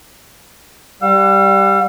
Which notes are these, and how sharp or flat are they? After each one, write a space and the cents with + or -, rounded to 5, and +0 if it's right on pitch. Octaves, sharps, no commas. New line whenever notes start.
G3 +0 F5 +40 E6 +40